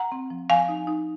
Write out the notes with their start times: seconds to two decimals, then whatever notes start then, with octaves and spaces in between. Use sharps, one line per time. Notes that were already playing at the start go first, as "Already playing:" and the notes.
Already playing: F#5 A#5
0.12 C4
0.30 F3
0.50 F3 F5 G#5
0.69 D#4
0.87 D#4